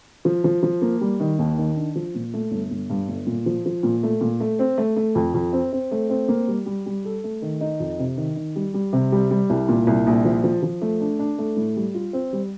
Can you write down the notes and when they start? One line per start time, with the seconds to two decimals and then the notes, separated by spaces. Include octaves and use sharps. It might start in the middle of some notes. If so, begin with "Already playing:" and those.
0.25 F3
0.44 F3
0.63 F3
0.82 A#3
1.01 G3
1.20 D#3
1.39 D#2
1.58 D#3
1.76 D4
1.95 F3
2.15 A#2
2.34 A3
2.51 G1
2.71 G1
2.90 G2
3.08 G1
3.27 A#2
3.46 F3
3.66 F3
3.83 A#2
4.03 A3
4.21 A#2
4.40 A3
4.59 C4
4.78 A3
4.96 A3
5.15 F2
5.34 F2
5.53 C4
5.73 C4
5.91 A3
6.10 C4
6.28 A#3
6.48 G3
6.66 G3
6.86 G3
7.05 A4
7.24 A3
7.42 D#3
7.61 D#4
7.80 F2
7.99 C3
8.17 D#3
8.36 D#3
8.56 G3
8.74 G3
8.93 C3
9.12 G3
9.31 G3
9.50 C2
9.69 A#2
9.87 C2
10.07 A#1
10.25 F3
10.44 F3
10.63 F3
10.82 A3
11.01 D4
11.19 D4
11.38 A3
11.56 A2
11.76 G3
11.95 F4
12.13 C4
12.33 G3